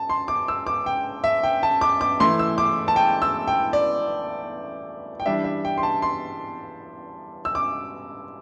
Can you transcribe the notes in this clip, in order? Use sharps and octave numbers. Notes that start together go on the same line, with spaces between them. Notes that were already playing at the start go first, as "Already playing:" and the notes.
Already playing: A5
C6
D6
E6
D6
G5
E5
G5
A5
D6
D6
E3 A3 E4 C6
E6
D6
A5
G5
E6
G5
D5
G5
E3 G3 D4 E5
E5
G5
C6
A5
C6
E6
D6